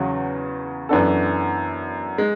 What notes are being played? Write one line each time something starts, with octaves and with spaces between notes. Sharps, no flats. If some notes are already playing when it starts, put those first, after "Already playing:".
Already playing: E2 C#3 F#3
F#2 E3 B3 D4 A4
G#3